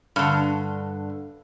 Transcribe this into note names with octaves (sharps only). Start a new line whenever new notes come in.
G2 D3